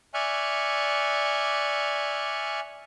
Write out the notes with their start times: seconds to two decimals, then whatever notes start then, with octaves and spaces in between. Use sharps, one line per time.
0.14 D5 E5 G#5 C#6 F6 F#6